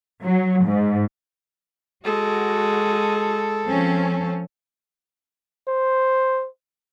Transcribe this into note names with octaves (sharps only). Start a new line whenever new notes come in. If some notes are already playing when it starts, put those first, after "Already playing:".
F#3
G#2
G#3 F#4 A4
F3 C4 C#4
C5